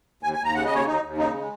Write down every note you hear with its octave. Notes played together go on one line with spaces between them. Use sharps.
D#2 G#5
G#5
D#2
A#5
C#3 F#5
D#5
D#2
C#5
D#2 D#4
D#2
C#3 D#4
G#3